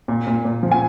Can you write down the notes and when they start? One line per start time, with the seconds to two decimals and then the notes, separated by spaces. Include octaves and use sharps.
0.08 A#2
0.27 A#2
0.45 A#2
0.63 F3
0.72 G#5